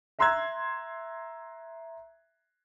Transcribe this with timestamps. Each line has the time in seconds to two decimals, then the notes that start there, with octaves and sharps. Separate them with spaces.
0.19 E5 A#5 C6 E6 F#6 G#6